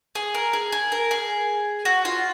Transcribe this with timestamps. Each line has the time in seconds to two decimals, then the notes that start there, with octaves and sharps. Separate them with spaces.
0.15 G#4
0.35 A#4
0.53 G#4
0.72 G#4
0.92 A#4
1.11 G#4
1.85 F#4
2.05 F4